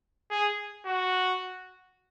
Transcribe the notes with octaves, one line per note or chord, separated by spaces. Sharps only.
G#4
F#4